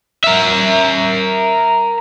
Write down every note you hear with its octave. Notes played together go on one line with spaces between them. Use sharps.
A#4 E5